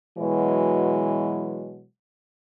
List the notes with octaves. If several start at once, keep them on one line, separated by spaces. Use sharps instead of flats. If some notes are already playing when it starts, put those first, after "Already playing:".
B2 E3 F#3 G#3